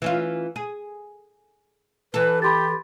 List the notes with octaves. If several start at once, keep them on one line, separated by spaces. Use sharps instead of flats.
E3 C#4 F4
G#4
E3 A4 B4
G4 B5 C6 A6